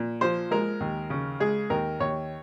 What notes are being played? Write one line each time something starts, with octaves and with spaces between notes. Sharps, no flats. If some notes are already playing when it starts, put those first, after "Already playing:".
Already playing: A#2
F3 C5
G#3 A#4
D#2
C#3
G#3 G#4
D#2 A#4
D#2 C#5